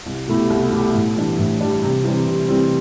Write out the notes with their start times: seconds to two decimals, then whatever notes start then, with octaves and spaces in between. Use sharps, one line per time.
0.06 C2
0.27 B2 A3 E4 G4
0.50 C2
0.72 B2 A3 E4 G4
0.95 A2
1.16 E3 G3 D4
1.39 A2
1.61 E3 G3 D4
1.83 C3
2.04 E3 G3 C4
2.27 C3
2.49 E3 G3 C4